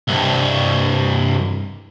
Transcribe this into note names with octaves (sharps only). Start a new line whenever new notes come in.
C2 G2